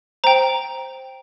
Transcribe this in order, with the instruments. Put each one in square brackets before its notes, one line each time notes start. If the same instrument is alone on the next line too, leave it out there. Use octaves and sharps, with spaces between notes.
[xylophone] C5 G5 A#5